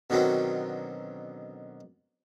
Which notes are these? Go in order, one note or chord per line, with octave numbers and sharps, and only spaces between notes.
B2 D3 D#3 F#3 C4 C#4